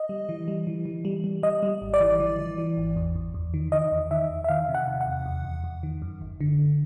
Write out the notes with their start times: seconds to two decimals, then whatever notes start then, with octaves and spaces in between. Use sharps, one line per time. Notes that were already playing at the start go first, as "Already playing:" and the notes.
Already playing: D#5
0.09 G3
0.29 E3
0.48 G3
0.67 E3
0.85 E3
1.05 G3
1.24 G3
1.43 G3 D#5
1.63 G3
1.82 G#1
1.94 D5
2.00 E3
2.20 E3
2.39 E3
2.58 E3
2.77 G#1
2.96 E2
3.16 E2
3.34 E2
3.54 D#3
3.72 D#3 D#5
3.92 E2
4.11 D#3 E5
4.30 E2
4.44 E5
4.48 D#3 F5
4.69 C3
4.74 F#5
4.88 C3
5.01 F#5
5.06 E2
5.26 E2
5.45 E2
5.64 E2
5.83 D#3
6.02 F#2
6.21 G1
6.41 D3
6.59 G1